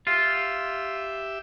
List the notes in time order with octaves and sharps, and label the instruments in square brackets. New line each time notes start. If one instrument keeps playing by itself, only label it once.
[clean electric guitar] F4 [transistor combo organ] G4 E5